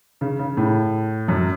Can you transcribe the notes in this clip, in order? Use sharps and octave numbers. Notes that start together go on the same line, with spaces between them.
C#3
C#3
A2
F#2